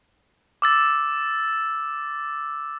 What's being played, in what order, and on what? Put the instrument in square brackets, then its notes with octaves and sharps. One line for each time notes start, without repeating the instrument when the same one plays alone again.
[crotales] D6 E6 A6